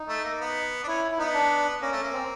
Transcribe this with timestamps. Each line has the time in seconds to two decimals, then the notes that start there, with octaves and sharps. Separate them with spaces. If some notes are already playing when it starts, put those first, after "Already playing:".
Already playing: D#4
0.09 A3
0.24 A#3
0.41 B3
0.83 D4
0.87 C#4 E4
1.12 E4
1.19 B3 D#4
1.34 D4
1.81 A#3 C#4
1.93 A3
1.98 C#4
2.03 A#3
2.13 C4